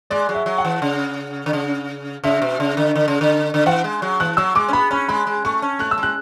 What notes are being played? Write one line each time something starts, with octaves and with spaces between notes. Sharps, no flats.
G#3 D5
F#3
E5
F#3
F#5
E3
C#3
D3
C#3
C#3 E5
B2
C#3
D3
D3
C#3
D3
D3
E3 F#5
G#3
F#3
E3 F#6
F#3 E6
G#3 D6
C#4
B3 B5
C#4 B5
G#3 B5
G#3
A3 C#6
C#4
A3 F#6
E6
G#3
F#6